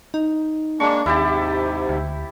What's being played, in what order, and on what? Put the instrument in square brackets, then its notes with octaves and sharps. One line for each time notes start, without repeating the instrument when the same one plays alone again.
[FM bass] D#4
[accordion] G#3 A#3 D4 [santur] C#6 D6
[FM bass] D#2 [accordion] G#2 C3 [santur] E4 G4 A5
[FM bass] D2